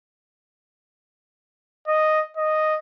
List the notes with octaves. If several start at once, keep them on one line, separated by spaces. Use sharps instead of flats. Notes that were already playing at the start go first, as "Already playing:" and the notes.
D#5
D#5